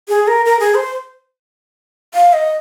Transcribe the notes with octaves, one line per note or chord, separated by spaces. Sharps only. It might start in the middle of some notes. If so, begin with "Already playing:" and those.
G#4
A#4
A#4
G#4
C5
F5
D#5